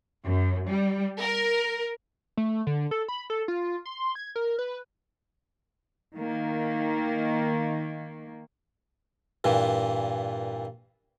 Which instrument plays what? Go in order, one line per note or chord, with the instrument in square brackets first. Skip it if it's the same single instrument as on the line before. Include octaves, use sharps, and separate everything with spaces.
[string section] F#2
G3
A#4
[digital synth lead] A3
D3
A4
B5
A4
F4
C6
G#6
A#4
B4
[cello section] D#3 A#3
[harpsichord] G2 A#2 E3